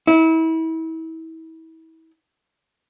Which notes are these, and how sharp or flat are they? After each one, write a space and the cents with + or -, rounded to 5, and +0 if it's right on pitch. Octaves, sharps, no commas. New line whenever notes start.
E4 -35